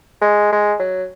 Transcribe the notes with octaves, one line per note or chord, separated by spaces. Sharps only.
G#3
G#3
F#3